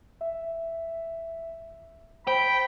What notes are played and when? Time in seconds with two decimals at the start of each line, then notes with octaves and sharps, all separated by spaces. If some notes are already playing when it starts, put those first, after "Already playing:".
0.21 E5
2.27 C5 G5 B5